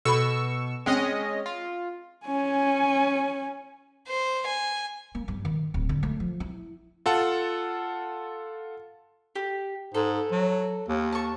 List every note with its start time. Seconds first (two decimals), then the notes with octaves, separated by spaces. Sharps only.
0.05 B2 A4 B5 C#6 E6
0.86 G#3 C4 C#4 D#5 G5
1.46 F4
2.26 C#4 G#5
4.08 C5
4.48 G#5
5.15 A#3
5.28 G2
5.45 D#3
5.74 D1
5.89 D3
6.03 A3
6.20 F3
6.40 E4
7.06 F4 A4 F#5 A5
9.35 G4
9.94 G#2 A4
10.32 F#3
10.89 D#2
11.12 A5 C#6